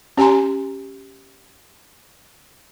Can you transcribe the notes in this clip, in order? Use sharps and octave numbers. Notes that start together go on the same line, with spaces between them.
C#4 G4 G#5 A#5 C6